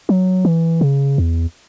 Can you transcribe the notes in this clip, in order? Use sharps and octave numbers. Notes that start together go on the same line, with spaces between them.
F#3
E3
C#3
E2